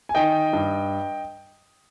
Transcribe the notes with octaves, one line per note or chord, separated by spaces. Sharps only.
G#5
D#3 D#5 G5
G2